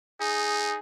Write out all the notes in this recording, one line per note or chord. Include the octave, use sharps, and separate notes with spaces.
D#4 G#4